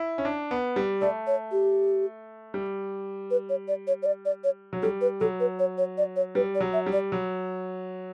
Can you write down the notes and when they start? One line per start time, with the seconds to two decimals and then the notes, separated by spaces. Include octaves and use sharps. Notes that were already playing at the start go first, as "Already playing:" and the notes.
Already playing: E4
0.18 C#4
0.25 D4
0.51 B3
0.76 G3
1.01 A3 D5
1.27 C#5
1.52 G4
2.54 G3
3.31 B4
3.49 C#5
3.68 D5
3.87 C#5
4.02 C#5
4.06 D5
4.25 D5
4.44 C#5
4.73 F#3
4.82 G3 A4
5.01 B4
5.20 F#3 A4
5.40 B4
5.59 C#5
5.78 C#5
5.98 D5
6.16 C#5
6.35 G3 B4
6.55 D5
6.60 F#3
6.73 E5
6.86 G3
6.92 D5
7.12 F#3